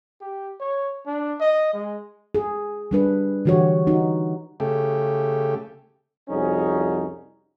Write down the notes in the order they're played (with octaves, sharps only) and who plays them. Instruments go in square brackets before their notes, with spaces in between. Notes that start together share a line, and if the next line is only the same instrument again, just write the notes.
[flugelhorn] G4
C#5
D4
D#5
G#3
[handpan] G#4
G3 D4 B4
D3 E3 F#4 G4 C#5
D#4 F#4
[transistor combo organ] C#3 A3 G4
[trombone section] C2 F2 C#4 D#4 F#4 G#4